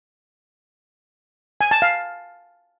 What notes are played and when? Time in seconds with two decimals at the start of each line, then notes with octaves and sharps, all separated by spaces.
1.61 G#5
1.71 A5
1.82 F5